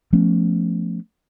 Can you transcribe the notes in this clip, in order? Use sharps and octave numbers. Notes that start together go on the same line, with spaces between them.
F3 A3 B3 C#4